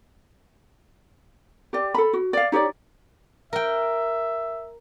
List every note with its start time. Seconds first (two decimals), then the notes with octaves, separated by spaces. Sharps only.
1.73 G4 D5
1.94 A4 B5
2.13 F#4
2.33 D5 F5
2.52 D#4 G4 C#5 D5
3.53 A#4 E5 G5